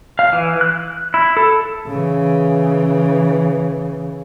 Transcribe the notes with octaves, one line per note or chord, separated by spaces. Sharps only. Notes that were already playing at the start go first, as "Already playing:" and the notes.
F5
E3
F#6
E4
A4
C#3 E3